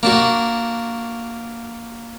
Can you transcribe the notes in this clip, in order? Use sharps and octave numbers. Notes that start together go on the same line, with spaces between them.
A#3 D4 F#4